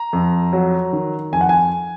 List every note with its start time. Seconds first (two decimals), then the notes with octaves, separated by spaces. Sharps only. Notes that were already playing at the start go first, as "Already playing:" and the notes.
Already playing: A#5
0.13 F2
0.53 F#3
0.93 D#3
1.32 F2 G#5
1.41 F#5
1.49 G#5